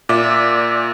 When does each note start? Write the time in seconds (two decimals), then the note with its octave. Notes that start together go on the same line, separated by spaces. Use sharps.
0.09 A#2 D5 E5